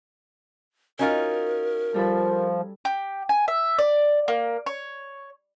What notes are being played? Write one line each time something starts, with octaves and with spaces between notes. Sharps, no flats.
C#4 D#4 F4 F#4 A#4
F3 G3 A4 B5
G4
G#5
E5
D5
A#3
C#5